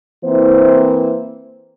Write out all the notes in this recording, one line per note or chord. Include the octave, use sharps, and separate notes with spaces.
E3 A#3 C4 E4 C5